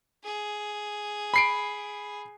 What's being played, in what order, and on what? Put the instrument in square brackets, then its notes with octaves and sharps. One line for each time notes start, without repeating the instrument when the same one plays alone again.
[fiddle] G#4
[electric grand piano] B5 C7 D7